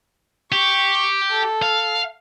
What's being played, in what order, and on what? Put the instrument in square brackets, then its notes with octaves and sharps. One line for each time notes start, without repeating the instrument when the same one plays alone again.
[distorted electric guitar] G4 [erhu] C#6
[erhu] A4
[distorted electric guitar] F5